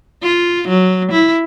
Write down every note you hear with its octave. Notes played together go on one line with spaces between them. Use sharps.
F4
F#3
E4